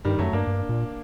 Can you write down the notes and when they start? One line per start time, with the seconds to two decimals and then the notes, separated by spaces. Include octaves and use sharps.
0.05 G2 D#3 G3
0.19 F#2 F#3 A3
0.33 G2 A#3 D4
0.47 G2
0.69 A#2